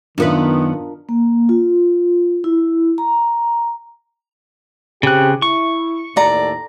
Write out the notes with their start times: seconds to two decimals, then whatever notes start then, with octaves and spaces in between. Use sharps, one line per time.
0.18 F#2 D#3 B3 D4 F4 A#4 B4
1.09 A#3
1.49 F4
2.44 E4
2.98 A#5
5.03 C#3 C4 G4 F#6
5.42 E4 C#6
6.17 D#2 A2 A4 D5 A#5